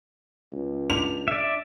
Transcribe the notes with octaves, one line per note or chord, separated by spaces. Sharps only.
C#2
D4 F7
D5 E5